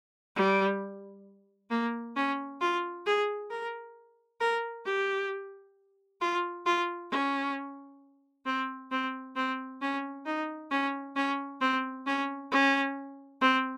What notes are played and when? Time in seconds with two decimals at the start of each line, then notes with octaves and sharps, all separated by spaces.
0.36 G3
1.70 A#3
2.16 C#4
2.61 F4
3.05 G#4
3.50 A#4
4.40 A#4
4.85 G4
6.21 F4
6.66 F4
7.11 C#4
8.45 C4
8.91 C4
9.36 C4
9.81 C#4
10.26 D#4
10.71 C#4
11.16 C#4
11.61 C4
12.06 C#4
12.52 C#4
13.41 C4